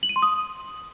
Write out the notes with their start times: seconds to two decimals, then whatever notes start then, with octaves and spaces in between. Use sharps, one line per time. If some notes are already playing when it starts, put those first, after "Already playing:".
0.03 F#7
0.09 D#7
0.16 C6
0.22 D#6